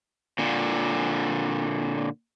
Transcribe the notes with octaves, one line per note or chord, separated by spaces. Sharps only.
A#2 D3